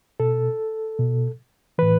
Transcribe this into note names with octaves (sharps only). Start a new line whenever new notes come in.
B2 A4
B2
A2 E3 B4